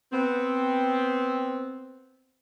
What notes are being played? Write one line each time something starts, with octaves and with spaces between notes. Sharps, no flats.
B3 C4